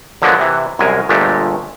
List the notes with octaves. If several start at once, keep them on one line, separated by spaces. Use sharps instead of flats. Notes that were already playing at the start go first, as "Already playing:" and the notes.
D3 F3 F#3 G#3 A#3 B3
C3 E3
C2 F#2 G#3 A#4 G#5
G1 A#2 G#3 A3 G4